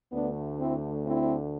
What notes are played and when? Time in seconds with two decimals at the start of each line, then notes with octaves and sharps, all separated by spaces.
0.12 D2 D3 A3 B3 D4
0.59 C4 E4
1.06 C4 E4